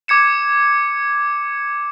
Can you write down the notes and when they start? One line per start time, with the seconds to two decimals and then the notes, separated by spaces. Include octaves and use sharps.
0.08 D6 G#6 C#7 E7